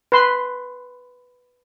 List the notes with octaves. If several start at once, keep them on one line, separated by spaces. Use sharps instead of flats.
B4 C6